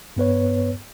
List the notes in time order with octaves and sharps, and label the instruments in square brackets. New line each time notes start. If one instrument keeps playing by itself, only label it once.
[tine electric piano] G2 B3 B4 C#5